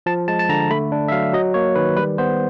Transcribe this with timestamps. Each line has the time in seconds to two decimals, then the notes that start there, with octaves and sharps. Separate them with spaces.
0.06 F3 A5
0.28 G#3 A5
0.39 A5
0.49 D3 A#5
0.71 A3 B5
0.92 D4
1.08 E5
1.12 F#3 F5
1.33 F#3 D#5
1.54 A#3 C#5
1.75 D#3 B4
1.96 G3 B4
2.18 B3 C5